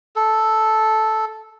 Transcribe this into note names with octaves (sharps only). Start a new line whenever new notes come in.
A4